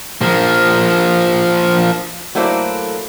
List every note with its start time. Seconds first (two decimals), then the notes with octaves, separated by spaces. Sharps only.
0.21 F3 A#3
2.35 F#3 A3 A#3 E4 C5 D5